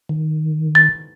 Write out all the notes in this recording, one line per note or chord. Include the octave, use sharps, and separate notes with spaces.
D#3
A6